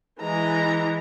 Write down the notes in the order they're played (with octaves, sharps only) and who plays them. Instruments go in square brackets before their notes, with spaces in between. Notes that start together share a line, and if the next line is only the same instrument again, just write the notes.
[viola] E3 [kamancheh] G#3 A#5